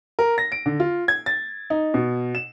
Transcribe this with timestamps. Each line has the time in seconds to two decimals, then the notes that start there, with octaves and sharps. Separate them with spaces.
0.19 A#4
0.38 A#6
0.52 D7
0.66 D3
0.80 F4
1.08 G#6
1.26 A6
1.70 D#4
1.94 B2
2.35 E7